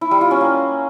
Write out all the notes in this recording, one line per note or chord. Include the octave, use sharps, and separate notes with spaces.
E4
G3
F4
C#4
A#3